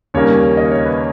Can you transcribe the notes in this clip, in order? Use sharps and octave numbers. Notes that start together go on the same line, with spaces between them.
D#2 C#3 G3 A#3 C#4 C#5
D#5
C#5
B4